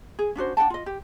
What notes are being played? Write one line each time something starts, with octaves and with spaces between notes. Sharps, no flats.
G#4
C#4 D4 F#4 C5
D4 F#5 G5 A5
F4 D#5
G4